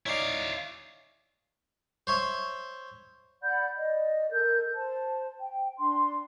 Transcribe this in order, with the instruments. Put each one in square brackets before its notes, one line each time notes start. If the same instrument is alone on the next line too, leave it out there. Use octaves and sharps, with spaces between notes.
[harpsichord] C#4 D#4 D5 [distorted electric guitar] E4 F5
[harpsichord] C5 C#5 E5
[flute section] D5 F#5 B5 G6
D5 D#5
A4 A#4 G6
C5 A5
G5
D4 C6